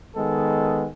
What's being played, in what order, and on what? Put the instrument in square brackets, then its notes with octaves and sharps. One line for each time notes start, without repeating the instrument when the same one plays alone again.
[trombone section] D#3 G#3 B3 A4